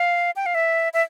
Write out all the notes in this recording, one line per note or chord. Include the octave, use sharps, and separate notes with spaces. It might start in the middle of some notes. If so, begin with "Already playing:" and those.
Already playing: F5
G5
F5
E5
E5